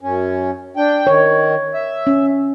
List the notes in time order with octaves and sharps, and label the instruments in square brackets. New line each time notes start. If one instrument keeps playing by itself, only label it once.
[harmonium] F#2 C#4
D4 G5
[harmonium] D#3 [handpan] C#5
[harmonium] E5
[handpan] C#4